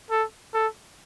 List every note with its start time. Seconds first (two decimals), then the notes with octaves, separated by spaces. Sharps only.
0.10 A4
0.54 A4